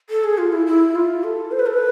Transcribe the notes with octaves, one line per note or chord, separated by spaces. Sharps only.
A4
G#4
F4
E4
E4
F4
A4
C5
B4
A4
B4